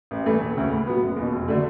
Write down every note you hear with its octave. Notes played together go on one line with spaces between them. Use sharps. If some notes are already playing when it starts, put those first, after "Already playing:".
A1
G2 E3 A3
E1
D2 C#3
A2
F#3 B3
F#1
E2
B2
F1
D3 F#3 A3